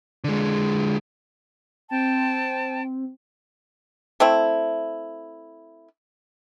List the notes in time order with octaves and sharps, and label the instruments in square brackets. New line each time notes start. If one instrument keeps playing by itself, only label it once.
[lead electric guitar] D3 G#3
[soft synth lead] C4 [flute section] G5 A5
[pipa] A3 C4 E4